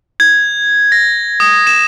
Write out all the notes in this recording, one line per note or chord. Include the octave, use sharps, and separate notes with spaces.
G#6
A#6
D#6
E7